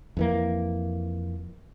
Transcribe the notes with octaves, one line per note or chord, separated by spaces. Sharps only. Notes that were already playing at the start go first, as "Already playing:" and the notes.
F2 E3 A#3